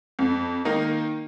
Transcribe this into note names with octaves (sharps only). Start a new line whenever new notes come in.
F2
D#3 A#3 D#4